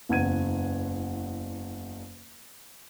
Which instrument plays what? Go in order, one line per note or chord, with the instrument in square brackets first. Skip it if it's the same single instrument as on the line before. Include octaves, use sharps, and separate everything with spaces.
[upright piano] F#1 E2 F#5 G#6 D#7